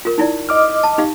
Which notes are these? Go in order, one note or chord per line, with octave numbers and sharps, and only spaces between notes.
F4 A#4
D#4 E4 D5
D#5 D6 F6
A5
D#4 G4 F5